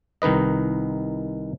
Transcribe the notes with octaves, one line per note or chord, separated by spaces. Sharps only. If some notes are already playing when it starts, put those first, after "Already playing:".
C2 D#3 D#4 B4 D#5